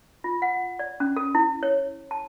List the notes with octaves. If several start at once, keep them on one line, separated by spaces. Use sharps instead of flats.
F4
F#5
D5
C#4
A4
E4
C#5
A5